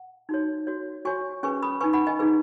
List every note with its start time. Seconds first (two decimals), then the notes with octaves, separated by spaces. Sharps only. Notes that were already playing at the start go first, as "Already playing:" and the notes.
Already playing: F#5
0.29 D#4 F#4 C#5
0.67 F#4 C#5
1.05 F#4 C#5 G#5 C#6
1.43 C#4 G#4 B4 G#5 C#6
1.62 B5 D#6
1.81 D#4 B4 G#5 C#6
1.93 F#5 B5
2.07 D#5 G#5
2.19 D#4 G#4 B4